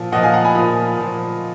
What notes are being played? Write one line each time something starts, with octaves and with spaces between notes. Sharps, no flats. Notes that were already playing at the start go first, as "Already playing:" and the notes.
Already playing: A#2 F3
A#2 F3 D#5 F#5
F5 G#5
F#5 A#5
G#5 B5
A#2 F3 B5 D#6
A#2 F3